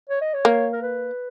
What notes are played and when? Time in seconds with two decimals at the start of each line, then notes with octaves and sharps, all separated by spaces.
0.10 C#5
0.21 D#5
0.34 C#5
0.45 A#3
0.73 A#4
0.82 B4